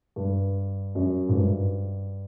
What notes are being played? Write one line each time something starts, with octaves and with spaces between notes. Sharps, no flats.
G2
F#2
G#2
G2